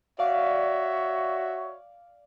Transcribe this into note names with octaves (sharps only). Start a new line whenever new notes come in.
F#4 C#5 D5 E5 F5